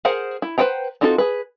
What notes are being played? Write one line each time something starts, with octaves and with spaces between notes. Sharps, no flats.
G#4 A#4 C5 F#5
E4
B4 C5 F#5 G5 A#5
C4 D#4 F4 F#4 A4
G#4 B4